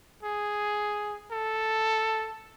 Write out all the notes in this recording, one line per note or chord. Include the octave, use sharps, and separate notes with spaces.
G#4
A4